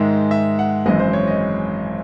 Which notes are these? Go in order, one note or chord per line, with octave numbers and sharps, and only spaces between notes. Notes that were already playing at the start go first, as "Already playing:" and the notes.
Already playing: G#2 D#3 G#3 D#4 E5
E5
F#5
G#1 F#2 E3 G#3 D#5
C5
C#5
D#5